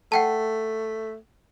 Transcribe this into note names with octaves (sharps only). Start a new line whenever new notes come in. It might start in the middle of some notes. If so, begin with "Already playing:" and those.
A3 F#5 G5 A5